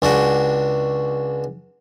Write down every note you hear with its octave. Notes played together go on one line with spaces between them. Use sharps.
C#2 D4 F#4